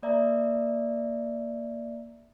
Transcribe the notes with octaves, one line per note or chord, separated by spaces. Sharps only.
A#3 D5 E5 A#5